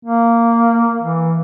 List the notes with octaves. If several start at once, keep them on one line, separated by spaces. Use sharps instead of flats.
A#3
E3